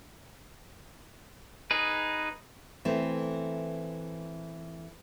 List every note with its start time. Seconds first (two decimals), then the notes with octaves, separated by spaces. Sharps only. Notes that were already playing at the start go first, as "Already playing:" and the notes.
1.71 D#4 G#4 B4
2.85 E3 A3 C4